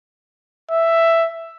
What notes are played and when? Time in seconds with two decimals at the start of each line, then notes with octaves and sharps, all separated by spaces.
0.71 E5